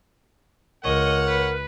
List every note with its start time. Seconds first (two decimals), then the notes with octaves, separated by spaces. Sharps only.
0.84 C#2 A#4 C#5 D#5 F#5
1.27 B4